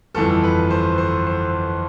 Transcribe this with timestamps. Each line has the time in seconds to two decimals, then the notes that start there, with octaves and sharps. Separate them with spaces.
0.15 G1 F2 E3 A4
0.43 B4
0.70 C5
0.98 C5
1.27 C5